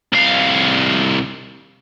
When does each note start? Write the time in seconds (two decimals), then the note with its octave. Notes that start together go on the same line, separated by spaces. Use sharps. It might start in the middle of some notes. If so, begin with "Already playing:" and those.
0.13 C2 F5